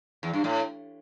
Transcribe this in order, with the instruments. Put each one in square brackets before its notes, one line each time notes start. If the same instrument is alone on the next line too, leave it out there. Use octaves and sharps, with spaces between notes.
[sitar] E2
G2
A2